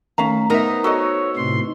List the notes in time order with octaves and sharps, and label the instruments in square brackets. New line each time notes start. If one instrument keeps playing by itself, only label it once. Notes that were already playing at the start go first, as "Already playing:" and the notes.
[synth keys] D#3 A3 [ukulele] C#4 F5 A#5
[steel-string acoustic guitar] B3 D#4 C5 [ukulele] A#4 E5 [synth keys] A#5 D#6
[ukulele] F#4 A4 D#5 [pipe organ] C#5 [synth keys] E6
[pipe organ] A2 C3 C6